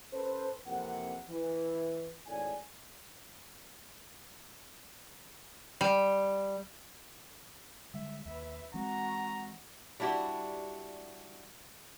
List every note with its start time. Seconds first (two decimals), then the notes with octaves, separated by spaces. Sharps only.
0.13 C#4 A4 B4 C5
0.66 F2 C3 E3 A#3 F#5
1.29 E3
2.26 G#1 A2 D5 G#5
5.81 G3
7.94 D3 G3 G#3 E5
8.25 D#2 B4 E5
8.74 E3 G#3 C4 F#4 A#5
10.00 G3 D4 E4 F#4 G4